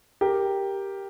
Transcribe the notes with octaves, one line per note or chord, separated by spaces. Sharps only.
G4 A#4